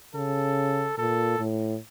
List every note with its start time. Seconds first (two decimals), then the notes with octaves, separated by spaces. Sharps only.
0.15 C#3 A4
0.98 A#2 A4
1.39 A2